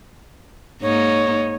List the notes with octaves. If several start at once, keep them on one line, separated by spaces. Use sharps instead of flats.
G#2 A#3 D#4 C#5